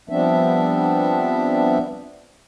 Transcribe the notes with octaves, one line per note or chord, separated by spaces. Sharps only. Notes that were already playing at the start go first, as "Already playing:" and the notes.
F3 G3 B3 C4 D4 E5